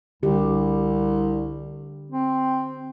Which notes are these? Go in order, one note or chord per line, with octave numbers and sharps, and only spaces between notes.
C2 D3 G4
C4